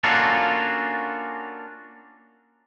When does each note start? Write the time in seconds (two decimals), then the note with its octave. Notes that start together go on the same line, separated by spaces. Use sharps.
0.04 A#3 C#4 D4 F4 F#4 A4